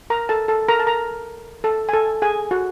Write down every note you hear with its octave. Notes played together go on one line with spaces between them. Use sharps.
A#4 A#5
A4 A5
A4 A5
A#4 A#5
A5
A#4 A#5
A4 A5
G#5
A4 A5
G#4 G#5
F#4 F#5